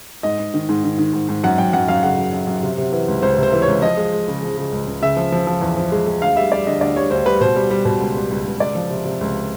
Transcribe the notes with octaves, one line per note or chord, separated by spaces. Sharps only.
G#2 D#5
G#2
D#3
G#2
D#3
D#3
G#2
G#2
F#2 F#5
F#2 G5
F#2 F#5
F#2 F5
C#3 F#5
F#2
F#2
F#2
C3
C3
E3
C#2
C#2 C5
C3
C5
E3
C#5
C#2
F3 D#5
G#3
G#3
C#3
F3
C#3
C#2
C#2
C#3 E5
F3
F3
F3
E2
F3
G#3
G#3
D2 F5
G3 E5
G3 D5
D3 D#5
D2 D5
G3 C#5
D2 C5
G3 B4
B2 C5
G3
G3
B2
C#2
G3
C#2
C#2
C#2 D5
F3
C3
C3
C#2